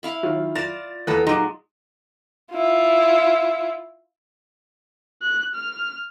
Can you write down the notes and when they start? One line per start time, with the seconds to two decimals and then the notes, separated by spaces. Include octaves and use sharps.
0.03 E4 F5 B5
0.23 D#3 F#3 F4
0.55 F4 D5 A6 A#6 E7 F7
1.07 E2 A#3 B3 A4 B4
1.27 A#2 F#3 G#3 D#4 C6 D6
2.53 E4 F4
5.22 F#6
5.55 F6